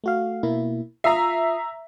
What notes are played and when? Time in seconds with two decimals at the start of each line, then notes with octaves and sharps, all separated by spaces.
0.04 A3 F#4 F5
0.43 B2 A#3 E4
1.04 F4 E5 A#5 D#6 C7